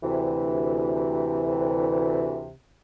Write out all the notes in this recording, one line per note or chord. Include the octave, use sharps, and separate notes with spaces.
D2 C3 E3